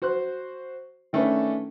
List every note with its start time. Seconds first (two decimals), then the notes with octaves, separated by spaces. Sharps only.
0.02 F#4 C5 C6 F#6
1.13 D#3 A3 C#4 D4 B4